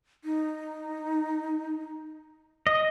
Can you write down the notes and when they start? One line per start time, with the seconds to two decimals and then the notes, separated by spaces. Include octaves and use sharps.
0.24 D#4
2.67 D#5